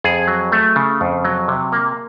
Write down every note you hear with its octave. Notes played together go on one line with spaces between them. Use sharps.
F2 G#4
F#3
A3
C#3
F2
F#3
C3
A#3